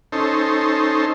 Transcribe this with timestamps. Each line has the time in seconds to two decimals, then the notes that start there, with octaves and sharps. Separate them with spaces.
0.12 C#4 D#4 A4 C5